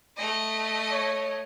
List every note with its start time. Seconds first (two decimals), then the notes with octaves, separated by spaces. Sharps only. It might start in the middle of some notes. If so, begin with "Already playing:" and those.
0.17 A3 D#5
0.92 C#5